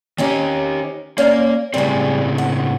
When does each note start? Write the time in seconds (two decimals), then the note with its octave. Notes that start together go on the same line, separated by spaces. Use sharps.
0.18 D#3 C4 C#4 D#4 G4
1.18 A#3 C#4 D5 F5
1.74 A2 C#3 G3 G#3 C4
2.38 F#5